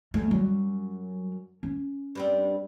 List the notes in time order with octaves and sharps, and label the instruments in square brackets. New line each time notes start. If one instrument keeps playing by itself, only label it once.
[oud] F#2 [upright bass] F3 A3
[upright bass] F#3 G3
C#4
[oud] G2 G3 C4